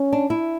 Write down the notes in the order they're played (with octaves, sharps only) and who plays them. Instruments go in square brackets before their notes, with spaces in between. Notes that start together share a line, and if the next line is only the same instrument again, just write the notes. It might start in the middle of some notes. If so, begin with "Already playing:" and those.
Already playing: [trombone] C#4
[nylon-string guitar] D4
E4